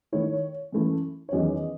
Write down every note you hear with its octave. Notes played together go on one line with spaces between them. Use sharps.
D#3 A3 E4 C#5
F#2 E3 A3 E4
C#5
E2 D#3 F#3 C#4 D#5